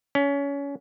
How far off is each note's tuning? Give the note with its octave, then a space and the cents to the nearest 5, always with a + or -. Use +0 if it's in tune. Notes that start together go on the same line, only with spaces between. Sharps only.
C#4 +25